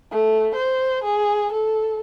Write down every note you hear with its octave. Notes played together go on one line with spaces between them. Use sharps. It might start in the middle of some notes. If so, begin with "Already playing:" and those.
A3
C5
G#4
A4